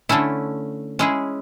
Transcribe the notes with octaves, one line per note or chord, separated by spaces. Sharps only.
D3 A3 C#4 E4
G#3 C#4 E4 G#4